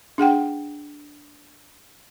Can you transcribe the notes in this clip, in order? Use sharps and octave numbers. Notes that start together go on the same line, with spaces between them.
D4 G#4 F#5 G5